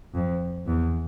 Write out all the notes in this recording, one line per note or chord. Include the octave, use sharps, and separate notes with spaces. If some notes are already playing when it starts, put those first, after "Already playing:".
F2
E2